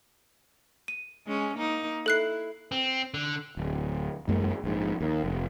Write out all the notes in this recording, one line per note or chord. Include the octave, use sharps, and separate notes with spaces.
D#7
G#3 C#4
A#3 D#4
E4 A4 F#6 C7
C4
D3
D1
A1 F#2 G#3 A#3
A#1 G#2
D#2
F1